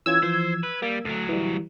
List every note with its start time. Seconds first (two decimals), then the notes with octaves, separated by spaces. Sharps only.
0.06 E3 C#4 F4 E6 G#6
0.23 E3 F3 C5
0.63 B4
0.82 G3 A#3
1.05 D2 F#3 A3
1.29 E3 G3